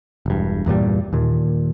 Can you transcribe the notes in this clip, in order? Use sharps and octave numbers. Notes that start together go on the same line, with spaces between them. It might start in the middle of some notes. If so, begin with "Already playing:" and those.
E1 G2
E2 G2 A#2 G3
D#2 A#2